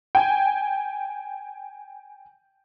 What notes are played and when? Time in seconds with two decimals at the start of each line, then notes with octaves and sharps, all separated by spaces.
0.15 G5 G#5